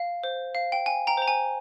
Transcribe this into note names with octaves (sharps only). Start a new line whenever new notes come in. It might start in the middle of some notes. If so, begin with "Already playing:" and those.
Already playing: F5
C5
F5
G5
G5 G#5
G5 A#5
C5 A#5
G#5